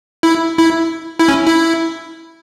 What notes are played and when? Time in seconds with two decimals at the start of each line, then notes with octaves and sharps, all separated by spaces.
0.23 E4
0.58 E4
1.19 E4
1.28 C#4
1.46 E4